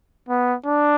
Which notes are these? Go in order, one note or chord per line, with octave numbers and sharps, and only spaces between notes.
B3
D4